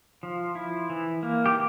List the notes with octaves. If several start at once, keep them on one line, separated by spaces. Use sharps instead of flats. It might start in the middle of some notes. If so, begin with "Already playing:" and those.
F3
E4
E3
A#3
G4